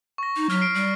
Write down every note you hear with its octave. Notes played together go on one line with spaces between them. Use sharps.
C#6 A#6
D#4
F#3 F6 B6
F6 C7 D7
G3